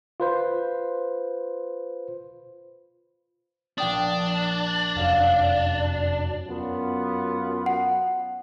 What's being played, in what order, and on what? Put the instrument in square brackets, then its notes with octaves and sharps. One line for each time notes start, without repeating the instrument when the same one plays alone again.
[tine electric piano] F4 B4 C5
[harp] A#1 G5 D#6 [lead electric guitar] D4
[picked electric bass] F1 [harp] F#2 F5
[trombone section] F#2 B3 F4
[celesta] F#5